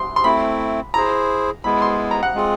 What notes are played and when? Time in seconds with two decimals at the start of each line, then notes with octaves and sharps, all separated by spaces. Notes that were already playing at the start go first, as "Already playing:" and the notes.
Already playing: C6
0.16 C6
0.24 A3 C4 E4 B5
0.94 E4 G#4 C5 A#5
1.64 G#3 B3 E4 B5
1.82 C6
2.11 A#5
2.23 F#5
2.34 G#3 C4 F4 G#4